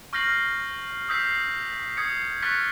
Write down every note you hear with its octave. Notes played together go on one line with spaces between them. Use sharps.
C#6 F6 G6 A#6 C7 F#7
D#6 E6 G6 B6 C7
D#6 G#6 C7 C#7
C#6 F6 F#6 A6 B6 C#7